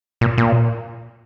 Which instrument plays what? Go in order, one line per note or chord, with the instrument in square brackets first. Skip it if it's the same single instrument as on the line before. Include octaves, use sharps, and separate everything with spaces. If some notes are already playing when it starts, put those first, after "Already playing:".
[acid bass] A#2
A#2